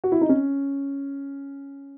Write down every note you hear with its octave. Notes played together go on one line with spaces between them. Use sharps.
F#4
E4
D#4
C#4